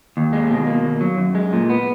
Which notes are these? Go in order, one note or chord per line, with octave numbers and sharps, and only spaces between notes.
D#2
G#3
B2
A#3
D#2
F#3
F#2
G#3
A#2
B3